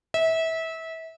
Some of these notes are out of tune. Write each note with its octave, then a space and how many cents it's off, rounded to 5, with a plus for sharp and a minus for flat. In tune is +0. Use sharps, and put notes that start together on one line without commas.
E5 -25